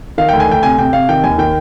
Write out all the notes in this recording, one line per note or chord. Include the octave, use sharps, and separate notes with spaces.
D#3 F5
D2 G5
G#5
D2 G5
C3 G#5
C3 G5
C3 F5
D#3 G5
D#2 G#5
D#3 G5